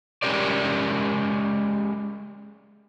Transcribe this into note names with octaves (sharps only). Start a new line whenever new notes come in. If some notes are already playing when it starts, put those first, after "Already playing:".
G#3 C#4 G4 A#4 D5